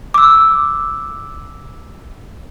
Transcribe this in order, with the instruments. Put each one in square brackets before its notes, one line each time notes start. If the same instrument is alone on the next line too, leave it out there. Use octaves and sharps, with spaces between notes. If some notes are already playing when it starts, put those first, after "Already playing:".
[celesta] D6 E6